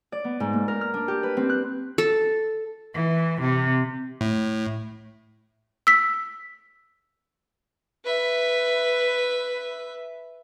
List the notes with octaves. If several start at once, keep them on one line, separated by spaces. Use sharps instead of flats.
D5
B3
G#2
A#3
A#4
F6
D4
G4
B4
C4
F#6
A4
E3
C3
A2
E6 B6
B4 E5